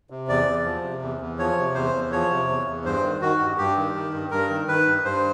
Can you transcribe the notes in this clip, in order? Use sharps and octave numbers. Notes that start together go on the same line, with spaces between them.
C3
E2 D5
E2
F3
C3
E2
E2
F3 C#5
C3
E2 C5
E2
F3 C#5
C3
E2
E2
G2 C5
D#3
D#3 F#4
G2
G2 G4
D#3
D#3
G2
G2 A#4
D#3
D#3 B4
G2
G2 C5